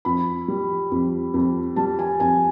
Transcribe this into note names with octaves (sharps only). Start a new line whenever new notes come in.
F2 B5
G3
F2
F2
G3 A5
G#5
F2 G#5